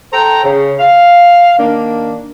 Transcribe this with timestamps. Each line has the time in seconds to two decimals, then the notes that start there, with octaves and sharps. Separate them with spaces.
0.12 A4 C5 G5 A#5
0.44 C#3
0.79 F5
1.58 D#3 A#3 D4